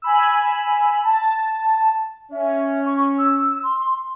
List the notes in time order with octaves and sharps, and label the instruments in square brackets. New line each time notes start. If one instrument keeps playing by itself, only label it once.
[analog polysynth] G#5 B5 E6
A5
[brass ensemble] C#4 [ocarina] E5
[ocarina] C#6
E6
C6